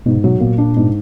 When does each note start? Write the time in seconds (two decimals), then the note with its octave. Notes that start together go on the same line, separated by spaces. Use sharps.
0.06 G#2 B2
0.24 B2 F#3
0.40 A#2 A#3
0.58 D4
0.76 G#2